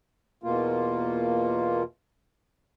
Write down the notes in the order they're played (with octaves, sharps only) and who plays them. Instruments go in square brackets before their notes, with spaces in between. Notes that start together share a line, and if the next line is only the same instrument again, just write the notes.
[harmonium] E2 B2 A#3 F4